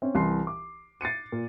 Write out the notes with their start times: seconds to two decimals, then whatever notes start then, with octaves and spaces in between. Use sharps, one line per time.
0.02 C4 C#4
0.15 C2 E3 C6 C7
0.47 D6
1.01 A6 C7 C#7 D#7
1.32 A#2